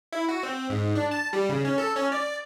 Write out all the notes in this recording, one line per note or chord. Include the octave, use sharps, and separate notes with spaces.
E4
F#4
C4
G#2
D4
A5
G3
C#3
C#4
A4
C#4
D5